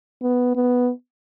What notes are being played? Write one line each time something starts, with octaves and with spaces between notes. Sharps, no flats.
B3
B3